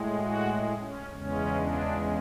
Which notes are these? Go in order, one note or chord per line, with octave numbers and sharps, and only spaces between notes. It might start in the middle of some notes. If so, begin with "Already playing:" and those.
Already playing: A2 G#3
F#4
C#4
E2 C#3 G#3 C#4
D4